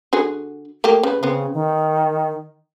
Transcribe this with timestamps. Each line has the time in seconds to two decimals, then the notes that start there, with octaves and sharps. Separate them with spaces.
0.13 D3 F#4 G#4
0.84 A3 A#3 G4
1.03 C#3 B4
1.23 C#3 B3 C4
1.54 D#3